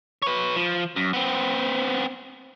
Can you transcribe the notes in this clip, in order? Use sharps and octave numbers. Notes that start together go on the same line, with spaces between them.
B4 C#5
F3
F#2
B3 C4